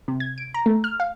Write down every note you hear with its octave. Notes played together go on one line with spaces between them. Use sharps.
C3
G#6
D7
A#5
A3
F6
F5